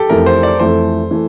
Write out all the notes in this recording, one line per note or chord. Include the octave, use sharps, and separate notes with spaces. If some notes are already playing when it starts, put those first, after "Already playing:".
Already playing: G4 A4
F2 E3 A3 A#4
C5
D5
F2 E3 A3 C5
E3 A3